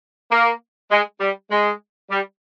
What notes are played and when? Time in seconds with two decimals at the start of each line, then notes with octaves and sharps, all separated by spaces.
0.30 A#3
0.90 G#3
1.20 G3
1.50 G#3
2.09 G3